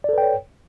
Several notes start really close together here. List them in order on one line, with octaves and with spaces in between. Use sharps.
D5 A4 B4 G5 C#5